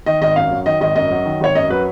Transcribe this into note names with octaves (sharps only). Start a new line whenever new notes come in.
D#3 D#5
G#1 D#5
F#2 F5
F#3
D#3 D#5
G#1 D#5
F#2 D#5
F#3
D#3
G#1 C#5
F#2 D#5
F#3 B4